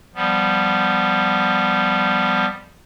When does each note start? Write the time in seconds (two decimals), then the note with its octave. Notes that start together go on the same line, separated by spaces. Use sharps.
0.15 F3 G3 B3